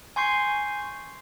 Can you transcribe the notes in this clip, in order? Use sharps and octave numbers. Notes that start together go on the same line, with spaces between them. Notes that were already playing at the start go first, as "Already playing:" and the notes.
G#5 C6 C#6 G6 C7